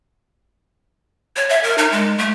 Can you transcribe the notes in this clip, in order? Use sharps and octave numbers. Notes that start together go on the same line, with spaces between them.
C#5
E5
A#4
D#4
G#3
A3